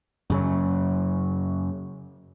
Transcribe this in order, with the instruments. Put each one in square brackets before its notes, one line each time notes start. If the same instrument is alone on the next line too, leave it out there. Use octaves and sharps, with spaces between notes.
[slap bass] F#2 C#3 F#3